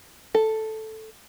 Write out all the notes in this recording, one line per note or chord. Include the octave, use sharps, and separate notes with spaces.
A4